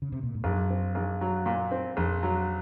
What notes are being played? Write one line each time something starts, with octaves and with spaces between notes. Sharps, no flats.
C#3
C3
A#2
G#2
A#1 F#2
C4
A#1
F#3
A#2
C4
A#1 F2
F#3